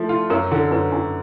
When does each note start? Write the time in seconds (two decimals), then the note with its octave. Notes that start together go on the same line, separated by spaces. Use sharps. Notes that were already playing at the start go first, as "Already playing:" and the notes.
Already playing: F3 A3
0.09 F4
0.30 F#2 A#4
0.52 D3
0.71 F#2 B4
0.92 F#2